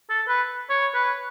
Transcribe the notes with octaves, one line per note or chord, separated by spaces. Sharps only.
A4
B4
C#5
B4